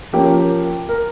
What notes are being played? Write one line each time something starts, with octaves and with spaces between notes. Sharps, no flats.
F3 A#3 C#4 G4
A#4